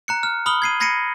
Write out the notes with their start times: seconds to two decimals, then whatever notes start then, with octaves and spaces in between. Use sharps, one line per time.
0.08 A#5 F#6 C#7
0.23 F6
0.46 B5 D#6 F6 F#7 G7
0.62 G#6 C7 D#7
0.80 B5 G#6 A#6 C7 C#7 D#7